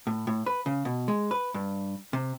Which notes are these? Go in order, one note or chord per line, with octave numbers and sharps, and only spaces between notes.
A2
A2
B4
C#3
B2
G#3
B4
G2
C3